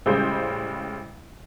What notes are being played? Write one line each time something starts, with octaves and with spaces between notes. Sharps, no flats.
A1 C#3 G3 G#3 C5 G6